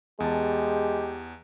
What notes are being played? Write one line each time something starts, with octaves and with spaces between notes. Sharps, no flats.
E2 G#3 G4 A5